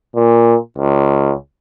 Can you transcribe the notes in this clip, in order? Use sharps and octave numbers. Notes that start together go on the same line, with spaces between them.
A#2
C#2